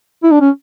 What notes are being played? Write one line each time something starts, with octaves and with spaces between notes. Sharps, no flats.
E4
D4
C#4